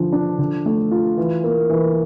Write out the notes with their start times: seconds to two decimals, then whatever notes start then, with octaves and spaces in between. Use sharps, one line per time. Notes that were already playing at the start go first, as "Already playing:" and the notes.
Already playing: D3 F3
0.12 D4
0.39 D3
0.66 A3
0.91 F4
1.17 E3
1.44 A#3
1.70 E3